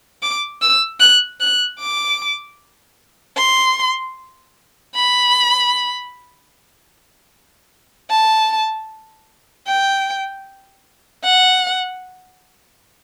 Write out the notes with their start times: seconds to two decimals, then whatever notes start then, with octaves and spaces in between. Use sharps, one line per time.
0.23 D6
0.62 E6
1.00 F#6
1.40 F#6
1.79 D6
3.37 C6
4.95 B5
8.10 A5
9.67 G5
11.24 F#5